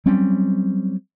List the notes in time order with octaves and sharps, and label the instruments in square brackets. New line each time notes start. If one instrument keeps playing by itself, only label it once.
[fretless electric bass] F#3 G3 C4 C#4